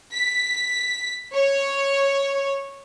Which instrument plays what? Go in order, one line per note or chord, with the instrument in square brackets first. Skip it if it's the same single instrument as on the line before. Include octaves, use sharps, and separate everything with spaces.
[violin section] B6
C#5